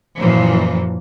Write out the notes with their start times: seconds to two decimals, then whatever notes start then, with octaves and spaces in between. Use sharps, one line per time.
0.18 F#2 A#2 E3 F3